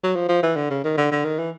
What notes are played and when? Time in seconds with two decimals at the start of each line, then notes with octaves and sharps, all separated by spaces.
0.03 F#3
0.15 F3
0.29 F3
0.43 E3
0.56 D3
0.70 C#3
0.84 D#3
0.97 D3
1.11 D3
1.25 D#3
1.39 E3